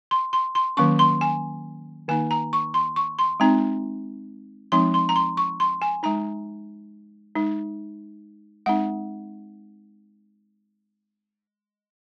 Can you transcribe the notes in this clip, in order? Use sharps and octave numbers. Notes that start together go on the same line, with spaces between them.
C6
C6
C6
D#3 F#3 A#3 C#4 C#6
C6
G#5
D#3 A#3 D#4 G#5
A#5
C#6
C6
C#6
C6
G#3 C4 D#4 A#5
F3 G#3 C4 D#4 C6
C6
A#5
C6
C#6
C6
G#5
G#3 D#4 A#5
G#3 D#4
G#3 C4 D#4 F#5